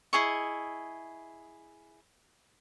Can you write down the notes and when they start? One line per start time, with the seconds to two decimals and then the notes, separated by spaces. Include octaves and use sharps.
0.13 E4 G#4 D#5 C#6